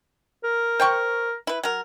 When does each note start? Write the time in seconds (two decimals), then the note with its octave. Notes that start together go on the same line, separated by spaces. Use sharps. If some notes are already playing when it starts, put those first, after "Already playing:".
0.44 A#4
0.80 C5 G5 C#6
1.47 E4 B4
1.63 F#3 A#4